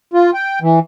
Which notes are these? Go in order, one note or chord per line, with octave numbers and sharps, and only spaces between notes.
F4
G5
E3